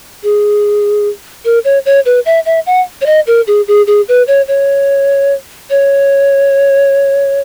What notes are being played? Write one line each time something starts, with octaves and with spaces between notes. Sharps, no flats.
G#4
A#4
C#5
C#5
B4
E5
E5
F#5
C#5
D#5
A#4
G#4
G#4
G#4
B4
C#5
C#5
C#5